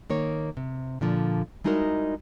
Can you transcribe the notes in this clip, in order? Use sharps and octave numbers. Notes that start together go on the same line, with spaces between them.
D#3 A#3 C#5
C3
A#2 D3 F3
G3 G#3 D#4 E4 F#4 A#4